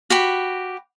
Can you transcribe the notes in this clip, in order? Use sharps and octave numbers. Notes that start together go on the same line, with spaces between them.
F#4 G4 B5